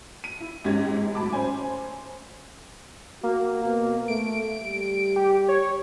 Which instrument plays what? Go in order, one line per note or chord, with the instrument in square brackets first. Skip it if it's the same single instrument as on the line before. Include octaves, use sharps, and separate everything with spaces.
[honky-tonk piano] D#7
E4
G#1 G#2 C#4 G4 G#6
G#1
A2 F#3 A5 B5 D6
C#4 C5 G#5
[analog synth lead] A#3 [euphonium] F#4
[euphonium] B2
[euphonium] A3 [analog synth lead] D7
[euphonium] G3
[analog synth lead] G4
C#5